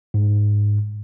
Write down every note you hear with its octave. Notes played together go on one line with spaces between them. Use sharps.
G#2